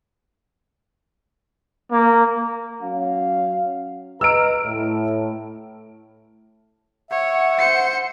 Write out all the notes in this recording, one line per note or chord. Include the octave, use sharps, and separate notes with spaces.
A#3
F#3 C#4 F5
B4 D#5 A#5 E6 F6 D7
A2
C#5 E5 F#5
C5 C#7